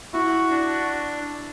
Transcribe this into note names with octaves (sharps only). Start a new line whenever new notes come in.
E4 F#4
D4